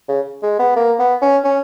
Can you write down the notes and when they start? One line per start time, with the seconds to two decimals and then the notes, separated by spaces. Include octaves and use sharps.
0.08 C#3
0.43 G#3
0.59 B3
0.76 A#3
0.99 B3
1.22 C#4
1.44 C#4